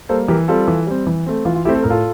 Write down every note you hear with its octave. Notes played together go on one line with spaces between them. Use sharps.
G3 A#3 A4 C5
E3 G4 A#4
G3 C4 F4 A4
E3
G3 C4
E3
A3 C4
E3 F4
F4
A3 C4 E4 G4
A4
A2 A#4
F4 A4